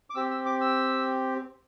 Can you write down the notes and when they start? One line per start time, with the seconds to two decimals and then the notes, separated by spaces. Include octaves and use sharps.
0.10 D6
0.15 C4 G4 E6
0.31 E6
0.46 D6
0.61 E6